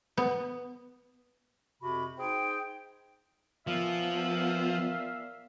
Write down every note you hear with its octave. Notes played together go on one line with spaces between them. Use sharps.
B3
F2 C3 F#4 B5
D#4 G#4 C5 G5
A#2 F3 B3 E5 F5